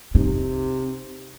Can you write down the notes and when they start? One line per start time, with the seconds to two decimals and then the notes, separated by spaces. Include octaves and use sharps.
0.15 C3 D#4